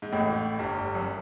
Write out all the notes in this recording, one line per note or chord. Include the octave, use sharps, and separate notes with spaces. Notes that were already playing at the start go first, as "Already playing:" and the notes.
G#2
A1 A2
G1 G2
F#2